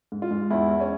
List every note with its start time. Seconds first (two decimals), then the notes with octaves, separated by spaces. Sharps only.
0.12 G#2
0.22 F4
0.31 G#2
0.51 E2 E4
0.70 E2
0.80 C#4